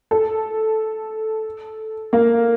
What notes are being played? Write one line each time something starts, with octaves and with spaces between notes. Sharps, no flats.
A4
A#3